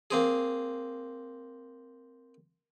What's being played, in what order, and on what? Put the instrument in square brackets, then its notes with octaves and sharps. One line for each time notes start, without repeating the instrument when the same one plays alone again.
[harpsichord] A#3 C4 G#4